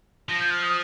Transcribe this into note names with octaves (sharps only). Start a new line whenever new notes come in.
F3 A#6
G6
F6
D#6